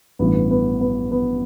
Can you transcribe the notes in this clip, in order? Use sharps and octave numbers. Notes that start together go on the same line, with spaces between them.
A1 G2 E3 B3
B3
B3
B3